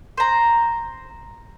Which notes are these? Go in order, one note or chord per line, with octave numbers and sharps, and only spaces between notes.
C5 A#5